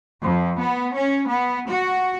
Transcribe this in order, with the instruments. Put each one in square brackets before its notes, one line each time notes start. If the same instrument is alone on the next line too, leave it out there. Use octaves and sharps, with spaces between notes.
[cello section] F2
B3
C#4
B3
F#4